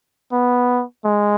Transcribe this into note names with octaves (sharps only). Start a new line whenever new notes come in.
B3
G#3